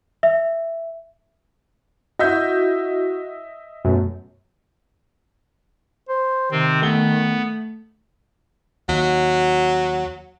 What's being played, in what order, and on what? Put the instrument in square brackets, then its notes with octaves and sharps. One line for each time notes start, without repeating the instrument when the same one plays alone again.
[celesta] E5
[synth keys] E4 F#4 [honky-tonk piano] D#5 E5 G6
[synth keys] F#2 B2 A3
[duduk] C5
[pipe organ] C3 C4 [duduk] D#3
[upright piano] A3 G7 [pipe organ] B3
[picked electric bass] D#2 [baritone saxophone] F#3